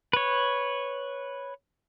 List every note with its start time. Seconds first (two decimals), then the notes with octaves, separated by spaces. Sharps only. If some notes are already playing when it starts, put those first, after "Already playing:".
0.13 B4 C#5